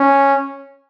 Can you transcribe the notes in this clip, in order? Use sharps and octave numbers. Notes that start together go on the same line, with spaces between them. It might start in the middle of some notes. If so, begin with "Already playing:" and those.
Already playing: C#4